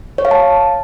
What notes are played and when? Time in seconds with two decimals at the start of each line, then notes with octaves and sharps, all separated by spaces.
0.18 C#5
0.25 F5
0.31 A5